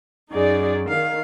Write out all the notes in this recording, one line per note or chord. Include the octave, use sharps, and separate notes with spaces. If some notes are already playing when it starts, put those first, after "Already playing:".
F#2 D#4 G#4 D5
D#3 F5